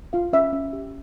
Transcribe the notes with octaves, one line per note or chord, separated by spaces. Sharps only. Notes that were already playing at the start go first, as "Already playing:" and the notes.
F4 F5
C#4 E5
C#4
G4